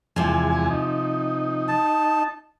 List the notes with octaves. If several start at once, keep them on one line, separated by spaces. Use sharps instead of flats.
E2 C3 F3 G#3 G#5
D#4
A5